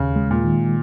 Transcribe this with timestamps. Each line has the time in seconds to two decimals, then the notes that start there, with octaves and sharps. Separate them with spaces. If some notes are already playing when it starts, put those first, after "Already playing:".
Already playing: D#2 C#3
0.16 G#3
0.31 A#2
0.44 D#3